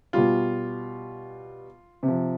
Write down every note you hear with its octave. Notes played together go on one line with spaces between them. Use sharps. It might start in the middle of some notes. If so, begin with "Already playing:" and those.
B2 G3 F4
C3
F3